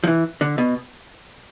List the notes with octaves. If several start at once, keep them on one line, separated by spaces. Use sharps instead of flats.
F3
E3
D3
B2